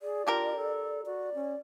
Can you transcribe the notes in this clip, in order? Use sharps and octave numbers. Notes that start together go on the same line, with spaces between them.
G#4 D5
D4 F4 G4 A#4
A4
F#4 D5
C#4